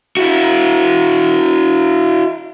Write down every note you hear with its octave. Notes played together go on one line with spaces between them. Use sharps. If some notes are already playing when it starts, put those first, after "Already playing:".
E4 F#4